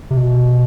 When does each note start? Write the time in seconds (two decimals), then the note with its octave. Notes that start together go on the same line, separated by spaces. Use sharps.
0.11 C3
0.17 B2